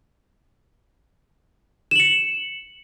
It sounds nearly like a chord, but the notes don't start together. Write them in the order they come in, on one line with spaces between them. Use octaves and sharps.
E7 F#7 C#7